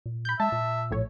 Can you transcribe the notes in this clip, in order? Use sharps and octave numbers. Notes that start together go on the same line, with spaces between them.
A#2
B5 G6
G#3 E5 A5
A#2
A#1 A2 C#5